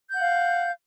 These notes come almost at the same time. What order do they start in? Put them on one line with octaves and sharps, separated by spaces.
G6 F#5 F5